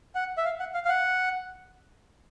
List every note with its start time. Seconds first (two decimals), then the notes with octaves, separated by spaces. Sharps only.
0.15 F#5
0.38 E5
0.45 F5
0.59 F#5
0.74 F5
0.85 F5
0.89 F#5